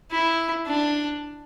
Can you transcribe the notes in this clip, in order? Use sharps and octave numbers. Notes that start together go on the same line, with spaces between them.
E4
D4